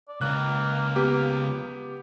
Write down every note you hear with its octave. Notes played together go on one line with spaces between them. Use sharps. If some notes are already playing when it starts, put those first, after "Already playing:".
D5
C#2 A#3 F#6
B3 G4